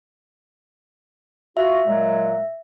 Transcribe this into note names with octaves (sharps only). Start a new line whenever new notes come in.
F4 F#4 E5
A#2 F#3 G#3